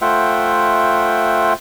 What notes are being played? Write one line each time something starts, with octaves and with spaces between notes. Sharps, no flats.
A3 F4 C5 E5 F#5 G5